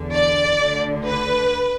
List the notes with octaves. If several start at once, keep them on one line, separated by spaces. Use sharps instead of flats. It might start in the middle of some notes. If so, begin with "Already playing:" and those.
Already playing: E2 D3
D5
D2 D3
B4